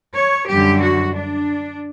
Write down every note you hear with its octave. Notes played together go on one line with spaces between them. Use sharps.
C#5
F#2 D3 G3 G4
F#4
D4